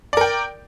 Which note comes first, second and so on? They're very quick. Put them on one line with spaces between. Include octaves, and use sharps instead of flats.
D5 A#4 G5